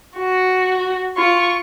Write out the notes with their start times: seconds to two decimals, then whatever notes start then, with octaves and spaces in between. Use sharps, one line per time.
0.17 F#4
1.17 F4 C#6